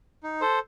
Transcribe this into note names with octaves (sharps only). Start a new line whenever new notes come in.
D#4
A4 C5